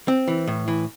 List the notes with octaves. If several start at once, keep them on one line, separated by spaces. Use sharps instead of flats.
C4
E3
A2
E3